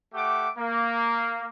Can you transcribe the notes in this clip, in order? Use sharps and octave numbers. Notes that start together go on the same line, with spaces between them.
A3 G4 F#5 D6
A#3